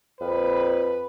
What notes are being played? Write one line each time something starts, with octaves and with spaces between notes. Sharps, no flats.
F2 B4